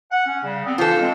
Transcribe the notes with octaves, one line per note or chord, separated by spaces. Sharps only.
F#5
C#4
C#3 G3
B3 C4
E3 D4 F4 A4 C5
G#3 C4